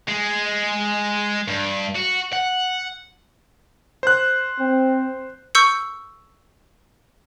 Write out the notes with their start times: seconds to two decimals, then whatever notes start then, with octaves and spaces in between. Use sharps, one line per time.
0.08 G#3
1.48 G2
1.95 F#4
2.33 F#5
4.03 C5 F#6
4.60 C4
5.55 C#6 E6 G6 C#7